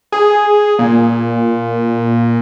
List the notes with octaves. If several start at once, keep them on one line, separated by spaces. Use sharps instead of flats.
G#4
A#2